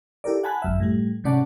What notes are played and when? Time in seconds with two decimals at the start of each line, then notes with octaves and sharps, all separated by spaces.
0.24 E4 G4 A4 A#4 D5
0.43 F#5 G#5 A5 B5 F#6
0.62 G#1 F#2 E5
0.80 A2 G3
1.24 G#2 C3 C#4 D5 F#5 A5